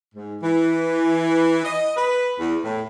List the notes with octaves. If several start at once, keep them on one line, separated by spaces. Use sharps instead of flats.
G#2
E3
D#5
B4
E2
A2